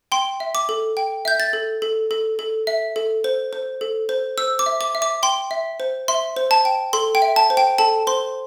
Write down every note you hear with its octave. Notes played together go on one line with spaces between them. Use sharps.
G5 C6
E5
D6
A4
G5
E5 G6
A6
A4
A4
A4
A4
E5
A4
C5
C5
A4
C5
C5 E6
D6
E5
D6
E5
D6
G5 C6
E5
C5
E5 C6
C5
A5
G5
A4 C6
G5
E5
A5
C5
G5
A4 A5
C5 C6